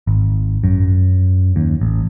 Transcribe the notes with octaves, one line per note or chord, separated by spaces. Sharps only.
G#1
F#2
D#2
A1